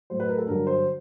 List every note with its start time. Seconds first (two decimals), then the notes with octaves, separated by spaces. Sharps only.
0.10 A2 F#3 C5
0.20 B4
0.29 A#4
0.38 A4
0.47 G2 D3 F#3 A#4
0.67 C5